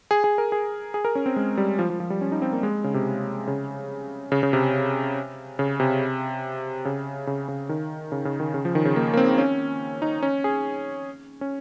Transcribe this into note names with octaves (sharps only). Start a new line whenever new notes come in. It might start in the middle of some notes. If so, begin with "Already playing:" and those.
G#4
G#4
A#4
G#4
G#4
A#4
C#4
C4
G#3
G3
F3
F3
F3
G3
C#4
D#4
C4
A#3
G#3
C#3
C3
C#3
C#3
C#3
C3
C#3
C3
C#3
C#3
C#3
D#3
C#3
C#3
D#3
C#3
F3
D#3
C#3
A#3
A#3
C4
C#4
D#4
C#4
G#4
C#4